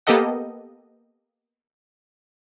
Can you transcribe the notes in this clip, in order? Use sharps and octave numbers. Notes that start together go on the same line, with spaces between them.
A#3 B3 G4 A4 D#5 F#5